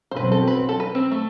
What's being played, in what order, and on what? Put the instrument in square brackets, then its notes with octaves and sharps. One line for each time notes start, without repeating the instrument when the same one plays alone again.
[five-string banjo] C5
[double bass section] B2 F#3 C4 [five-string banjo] B4
[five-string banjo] A4
B4
A4
B4
C4
A3